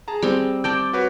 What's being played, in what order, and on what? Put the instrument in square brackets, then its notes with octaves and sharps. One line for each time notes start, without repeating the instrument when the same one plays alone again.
[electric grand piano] G#4 A5 A#5
[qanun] G3 C4
[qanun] D5 G5 [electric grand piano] A5 G6
[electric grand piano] D6
F#4 B4 C#5